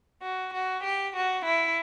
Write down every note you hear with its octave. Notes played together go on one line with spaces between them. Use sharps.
F#4
F#4
G4
F#4
E4